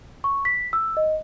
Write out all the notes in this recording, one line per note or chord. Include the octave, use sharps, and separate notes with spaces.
C#6
B6
E6
D#5